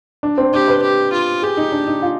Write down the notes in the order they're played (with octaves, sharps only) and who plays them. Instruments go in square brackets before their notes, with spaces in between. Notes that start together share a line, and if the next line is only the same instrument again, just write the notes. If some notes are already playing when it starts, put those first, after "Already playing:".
[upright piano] D4
C4
[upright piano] D4 [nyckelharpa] G4
[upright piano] B4
[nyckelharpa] G4
F4
[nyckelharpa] G4 [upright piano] G#4
[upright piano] D#4
D4
D#4
F4